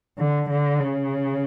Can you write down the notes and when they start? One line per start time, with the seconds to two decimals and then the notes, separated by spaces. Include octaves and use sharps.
0.19 D3
0.50 D3
0.79 C#3